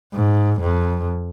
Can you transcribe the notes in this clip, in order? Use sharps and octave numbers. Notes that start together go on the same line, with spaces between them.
G#2
F2